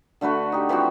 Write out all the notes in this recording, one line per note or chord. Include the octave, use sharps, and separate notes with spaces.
D3 A3 F#4 B4
D#4 G4
E3 F3 C4 F#4